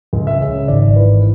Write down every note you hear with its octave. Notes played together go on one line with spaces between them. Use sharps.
C#2
E5
C#3
G#1 D5
E3 B4